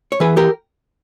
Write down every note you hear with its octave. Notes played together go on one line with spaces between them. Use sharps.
C#5
E3 G#4 B4
G4 A#4